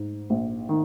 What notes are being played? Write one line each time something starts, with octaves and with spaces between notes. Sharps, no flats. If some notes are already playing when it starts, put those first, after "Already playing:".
Already playing: G#2
A#1
D#3